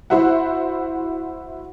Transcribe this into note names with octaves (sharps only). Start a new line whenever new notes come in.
E4 F#4 C5 E5 F#5